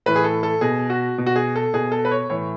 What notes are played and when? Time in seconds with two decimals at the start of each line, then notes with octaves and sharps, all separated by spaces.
0.06 A2 E3 B4
0.16 G#4
0.24 A4
0.43 A4
0.61 B2 G#4
0.90 F#4
1.18 B2
1.26 F#4
1.36 G#4
1.56 A4
1.74 B2 G#4
1.92 A4
2.05 B4
2.11 C#5
2.30 A2 E3 C#5